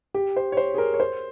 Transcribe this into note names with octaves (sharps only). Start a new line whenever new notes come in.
G4
C5
C#5
C5
G#4
A#4
C#5
C5